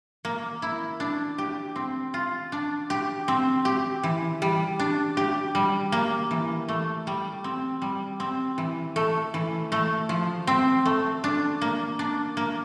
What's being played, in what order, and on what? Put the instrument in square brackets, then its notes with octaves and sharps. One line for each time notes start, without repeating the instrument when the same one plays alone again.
[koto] A#3
E4
D4
G4
C4
F4
D4
G4
C4
G4
E3
G3
D4
G4
G3
A#3
E3
A3
G3
C4
G3
C4
E3
A3
E3
A3
F3
C4
A3
D4
A#3
D4
A#3